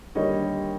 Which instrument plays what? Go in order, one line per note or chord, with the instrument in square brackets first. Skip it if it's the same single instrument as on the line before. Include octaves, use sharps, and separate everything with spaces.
[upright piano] D#2 D3 G3 C#5 D#5